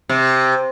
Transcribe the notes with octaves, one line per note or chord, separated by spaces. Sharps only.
C3